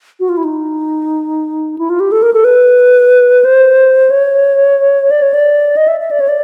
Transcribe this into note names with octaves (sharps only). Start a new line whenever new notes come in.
F#4
F4
E4
D#4
E4
F4
G4
A4
A#4
A4
B4
C5
C#5
D5
C#5
D5
D#5
E5
E5
D5
C#5
D5